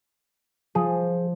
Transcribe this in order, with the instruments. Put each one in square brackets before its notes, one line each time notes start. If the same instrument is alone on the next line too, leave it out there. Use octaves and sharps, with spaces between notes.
[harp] F3 [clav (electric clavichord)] G#4